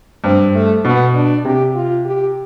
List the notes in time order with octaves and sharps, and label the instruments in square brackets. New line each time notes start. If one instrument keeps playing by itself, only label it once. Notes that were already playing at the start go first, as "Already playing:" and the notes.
[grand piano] G2 [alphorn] C4
[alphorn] A3
[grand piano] B2 [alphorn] B3
[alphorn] D4
[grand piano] C3 [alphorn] G4
[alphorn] F4
G4